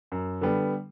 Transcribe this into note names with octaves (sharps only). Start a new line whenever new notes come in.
F#2
D3 G3 B3